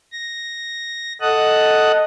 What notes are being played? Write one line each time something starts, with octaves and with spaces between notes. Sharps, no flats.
A#6
A4 D#5 F#5 A5 D#6 F#6